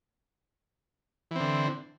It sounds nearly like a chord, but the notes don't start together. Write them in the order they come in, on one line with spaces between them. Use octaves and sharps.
E3 C4 D3